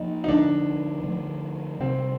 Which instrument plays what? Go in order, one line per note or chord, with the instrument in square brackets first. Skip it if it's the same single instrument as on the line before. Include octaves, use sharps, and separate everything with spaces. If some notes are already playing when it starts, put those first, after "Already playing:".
Already playing: [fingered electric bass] F3 A#3 [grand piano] D#4
[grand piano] D#4
[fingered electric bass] D3 F3 A3 [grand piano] D4
[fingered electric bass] D3 F3 A3
[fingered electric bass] C3 D#3 G3 [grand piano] C4